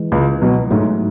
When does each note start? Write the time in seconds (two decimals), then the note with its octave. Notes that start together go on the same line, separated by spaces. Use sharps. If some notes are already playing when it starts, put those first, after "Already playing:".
Already playing: E3 G#3
0.12 C#2
0.42 B2 F#3
0.71 G#2 F#3 A3